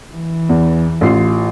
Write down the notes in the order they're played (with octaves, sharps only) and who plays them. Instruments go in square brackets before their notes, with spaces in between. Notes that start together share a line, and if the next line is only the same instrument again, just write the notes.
[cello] E3
[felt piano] E2
A1 F4 C7